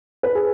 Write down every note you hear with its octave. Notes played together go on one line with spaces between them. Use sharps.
B4
G#4